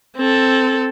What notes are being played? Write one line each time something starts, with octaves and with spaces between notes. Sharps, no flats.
C4 A4